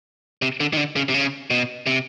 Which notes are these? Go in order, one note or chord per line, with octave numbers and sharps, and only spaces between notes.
C3
D3
D#3
D3
C#3
C3
C#3
B2
C3